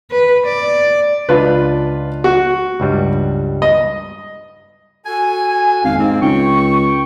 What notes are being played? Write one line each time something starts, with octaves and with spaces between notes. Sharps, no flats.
B4
D5
C#2 D4 F4 B4
F#4
C#2 G2 G3
D#5
F#4 A4 G#5
G#1 F2 F5
G#2 A#3 C4
C#2 G5 C#6